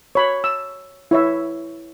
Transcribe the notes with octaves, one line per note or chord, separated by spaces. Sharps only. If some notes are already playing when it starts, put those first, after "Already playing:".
C#5 B5
E6
E4 C#5 E5